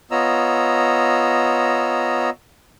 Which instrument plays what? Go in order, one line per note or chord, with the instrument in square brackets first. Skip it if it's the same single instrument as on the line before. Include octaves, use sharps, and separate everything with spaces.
[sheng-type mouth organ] B3 F4 C#5 D#5 A#5 E6